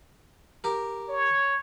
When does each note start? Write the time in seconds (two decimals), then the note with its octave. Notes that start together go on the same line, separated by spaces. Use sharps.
0.64 G4 A#4
1.09 C#5